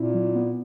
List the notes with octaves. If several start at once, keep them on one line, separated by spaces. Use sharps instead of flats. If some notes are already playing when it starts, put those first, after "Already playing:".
Already playing: A#2 C4 E4
F#3
B3